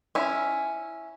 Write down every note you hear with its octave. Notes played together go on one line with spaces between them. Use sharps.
C#4 E4